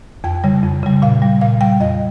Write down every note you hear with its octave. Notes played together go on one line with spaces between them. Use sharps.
F2 G5
C#3 G3
F2
C#3 G3
A#2 F5
G3
A#2 F5
G3 G5
F2 D#5